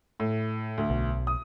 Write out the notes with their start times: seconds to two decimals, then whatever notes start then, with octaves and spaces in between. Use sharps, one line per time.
0.20 A2
0.78 D2
0.90 B1
1.27 D#6